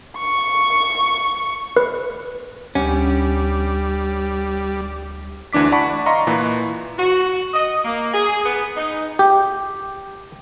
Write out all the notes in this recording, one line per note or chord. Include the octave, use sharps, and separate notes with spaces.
C#6
B4
D2 G3 C#4
D2 E3 D4 D6 B6
D5 F#5 A5 B5 C#6 B6
D#5 F5 A#5 C6 C#6
A#2 E3 B4 B5
F#4
D#5
A#3
G#4
B3
D#4
G4